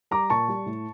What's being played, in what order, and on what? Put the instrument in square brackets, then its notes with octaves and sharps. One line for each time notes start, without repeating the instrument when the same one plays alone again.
[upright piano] G3 A#5 D6
A#2 A5 C#6
G3
A2